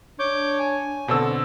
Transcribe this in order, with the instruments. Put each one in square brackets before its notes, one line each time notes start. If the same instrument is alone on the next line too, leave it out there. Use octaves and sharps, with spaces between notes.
[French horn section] D4 [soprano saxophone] C#5 [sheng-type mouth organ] D6 G6
[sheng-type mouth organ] G#5
[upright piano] B2 C4 E6 [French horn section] D3 [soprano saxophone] A4